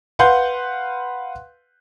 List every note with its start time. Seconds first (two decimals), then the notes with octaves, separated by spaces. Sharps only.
0.19 B4 F5 F#5 C6 F#6 G6